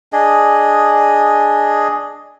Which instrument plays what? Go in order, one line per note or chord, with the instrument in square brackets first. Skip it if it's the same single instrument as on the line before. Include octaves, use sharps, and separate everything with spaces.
[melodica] D4 G#4 D#5